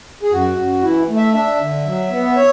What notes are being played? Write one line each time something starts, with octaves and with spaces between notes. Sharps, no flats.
G#4
F#2 F#4
F#2
E3 E4
A3
E5
D4 E5
D3
F#3
B3
C#5